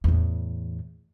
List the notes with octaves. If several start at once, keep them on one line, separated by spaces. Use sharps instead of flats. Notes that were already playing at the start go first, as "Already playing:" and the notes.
E2 A2